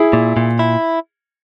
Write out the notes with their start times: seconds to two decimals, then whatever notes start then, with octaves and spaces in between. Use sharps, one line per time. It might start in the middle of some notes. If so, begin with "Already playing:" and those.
Already playing: E4 G#4
0.13 A#2
0.37 A#2
0.59 E4